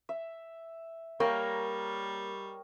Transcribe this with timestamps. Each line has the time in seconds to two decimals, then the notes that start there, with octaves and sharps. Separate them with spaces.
0.09 E5
1.20 G3 A#3 A#4 C#5 D#5 G5